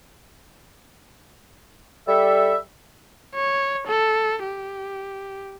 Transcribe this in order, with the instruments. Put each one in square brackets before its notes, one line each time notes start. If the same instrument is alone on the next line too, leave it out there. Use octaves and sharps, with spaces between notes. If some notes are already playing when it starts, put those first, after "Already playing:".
[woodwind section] G3 A4 E5
[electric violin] C#5
A4
G4